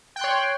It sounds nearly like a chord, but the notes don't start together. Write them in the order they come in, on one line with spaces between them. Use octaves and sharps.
G5 F#6 C6 C#5